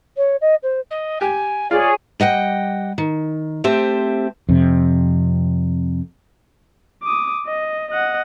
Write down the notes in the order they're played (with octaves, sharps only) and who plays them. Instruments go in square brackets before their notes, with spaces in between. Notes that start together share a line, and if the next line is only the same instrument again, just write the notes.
[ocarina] C#5
D#5
C5
[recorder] D#5
[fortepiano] G4 [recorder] G#5
[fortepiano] F4 [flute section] G#4 C#5 [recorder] D5
[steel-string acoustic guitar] G3 D#5 F#5 G5
D#3
A3 C4 G4 C5 E5
[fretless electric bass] F2 C3
[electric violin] D6 D#6
D#5
D#5 F#5